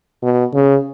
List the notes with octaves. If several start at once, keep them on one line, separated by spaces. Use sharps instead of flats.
B2
C#3